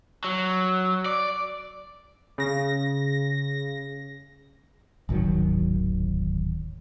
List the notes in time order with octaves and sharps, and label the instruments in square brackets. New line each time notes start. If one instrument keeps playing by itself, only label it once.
[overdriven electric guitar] F#3
D5
[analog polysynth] C#3 A#6
[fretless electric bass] D1 G#1 D#3 F#3